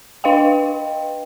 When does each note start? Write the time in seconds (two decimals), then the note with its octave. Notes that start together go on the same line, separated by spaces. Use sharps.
0.24 D4 B4 D#5 F5 G5